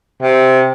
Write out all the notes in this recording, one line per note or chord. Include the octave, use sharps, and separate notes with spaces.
C3